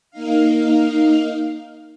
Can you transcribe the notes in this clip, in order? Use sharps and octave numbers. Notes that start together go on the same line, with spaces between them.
A#3 D#4 F5